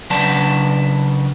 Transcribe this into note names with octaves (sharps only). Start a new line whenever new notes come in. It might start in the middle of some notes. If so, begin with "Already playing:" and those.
C#3 F#3 D4 B4 D5 A5